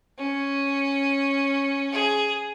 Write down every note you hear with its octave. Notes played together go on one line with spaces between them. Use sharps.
C#4
G#4